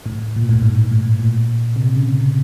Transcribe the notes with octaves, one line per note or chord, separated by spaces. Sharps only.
A2
A#2
A2
G#2
A2
A#2
C3
C#3
C3